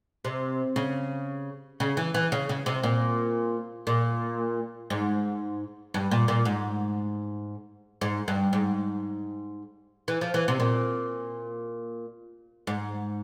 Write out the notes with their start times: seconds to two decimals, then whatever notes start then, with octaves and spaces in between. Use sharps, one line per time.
0.25 C3
0.76 C#3
1.80 C#3
1.97 E3
2.14 E3
2.32 C#3
2.49 C#3
2.66 C3
2.83 A#2
3.87 A#2
4.90 G#2
5.94 G2
6.11 A#2
6.28 A#2
6.45 G#2
8.01 G#2
8.28 G2
8.53 G#2
10.08 E3
10.21 F3
10.34 E3
10.48 C3
10.60 A#2
12.67 G#2